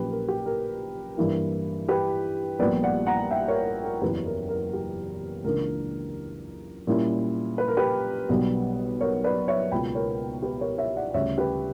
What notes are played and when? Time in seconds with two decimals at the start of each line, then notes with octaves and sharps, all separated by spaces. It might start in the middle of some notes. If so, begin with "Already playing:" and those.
Already playing: A#1 A#2 F#3 C#4 G4 B4
0.11 A#4
0.28 G4
0.46 A#4
1.18 G2 E3 A#3 E4
1.89 G4 B4
2.59 A#1 A#2 G3 B3 B4 D5
2.83 D5 F#5
3.07 F#5 A#5
3.31 E5 G5
3.48 A#4 C#5
3.66 A#4
3.84 A#4
4.01 F#1 E2 C#3 F#3 G4 B4
4.26 A#4
4.49 A#4
4.73 G4
5.44 C#2 C#3 E3 A#3 D4 A#4
6.87 A#2 G3 C#4 E4
7.58 B4
7.68 A#4
7.77 G4 B4
8.29 B1 B2 G3 B3
9.01 A#4 C#5
9.24 B4 D5
9.48 C#5 E5
9.71 C#2 B2 A#3 G5 B5
9.95 A#4 C#5
10.42 G4 B4
10.61 A#4 C#5
10.78 C#5 E5
10.96 D5 F#5
11.14 D2 C#3 G3 C#4 C#5 E5
11.38 G4 B4